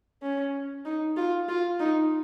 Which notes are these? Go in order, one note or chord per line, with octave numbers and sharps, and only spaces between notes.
C#4
D#4
F4
F4
D#4